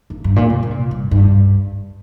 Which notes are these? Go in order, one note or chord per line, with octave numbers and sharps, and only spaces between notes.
F2
G2
A#2
C3
C3
A#2
G2
G2